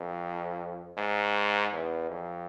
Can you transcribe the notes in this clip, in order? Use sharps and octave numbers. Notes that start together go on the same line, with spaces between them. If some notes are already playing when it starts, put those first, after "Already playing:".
Already playing: F2
G#2
E2
F2